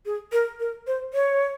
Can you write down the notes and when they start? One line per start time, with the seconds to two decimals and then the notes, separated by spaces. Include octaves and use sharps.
0.06 G#4
0.32 A#4
0.60 A#4
0.87 C5
1.14 C#5